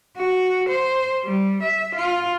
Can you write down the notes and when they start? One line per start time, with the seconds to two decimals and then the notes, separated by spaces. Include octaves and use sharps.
0.18 F#4
0.69 C5
1.25 G3
1.63 E5
1.95 F4